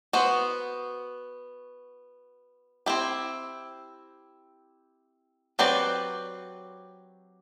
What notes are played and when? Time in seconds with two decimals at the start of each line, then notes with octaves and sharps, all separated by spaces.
0.13 B3 F#4 C5
2.86 C4 E4 G4
5.59 F#3 C4 G4 B4 D5